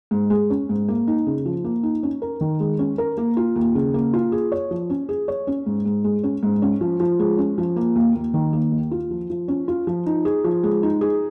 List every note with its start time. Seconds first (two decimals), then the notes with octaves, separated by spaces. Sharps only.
0.11 G#2
0.30 G#3
0.50 C#4
0.69 G#2
0.88 A#3
1.08 D#4
1.27 C#3
1.46 F3
1.64 A#3
1.83 D#4
2.03 C#4
2.22 A#4
2.41 D#3
2.60 G#3
2.79 C#4
2.98 A#4
3.18 A#3
3.37 F4
3.56 D#2
3.75 C#3
3.94 A#3
4.13 F4
4.32 G#4
4.52 C#5
4.71 F3
4.90 C#4
5.09 G#4
5.28 C#5
5.47 C#4
5.66 G#2
5.86 G#2
6.04 G#3
6.24 C#4
6.43 G#2
6.62 C#4
6.81 F3
7.00 F3
7.19 G#3
7.38 C#4
7.58 F3
7.76 A#3
7.96 D#2
8.15 D#2
8.34 D#3
8.53 A#3
8.72 D#2
8.91 F4
9.11 F3
9.30 F3
9.48 C#4
9.68 F4
9.87 F3
10.06 D#4
10.25 G#4
10.44 F3
10.63 G#3
10.83 D#4
11.01 G#4